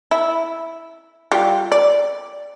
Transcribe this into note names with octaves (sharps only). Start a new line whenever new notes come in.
E4
G3 F4 G4
D5